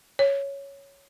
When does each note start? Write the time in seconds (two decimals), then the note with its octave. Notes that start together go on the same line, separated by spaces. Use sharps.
0.19 C#5